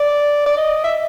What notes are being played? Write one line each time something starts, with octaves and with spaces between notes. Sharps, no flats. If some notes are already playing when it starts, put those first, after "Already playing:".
Already playing: D5
D5
D#5
E5